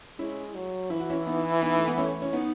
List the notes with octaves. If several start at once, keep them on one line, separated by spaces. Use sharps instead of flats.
G#3 C#4 E4
F#3
E3 E4
F#4
C#4 E4
B3 D#4
B3 D#4
A3
B3
A3 C#4
C#4
B3 D#4